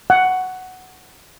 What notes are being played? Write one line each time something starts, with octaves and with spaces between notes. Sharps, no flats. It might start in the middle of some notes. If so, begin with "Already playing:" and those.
F#5